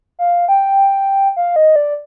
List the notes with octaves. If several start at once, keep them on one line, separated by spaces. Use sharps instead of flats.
F5
G5
F5
D#5
D5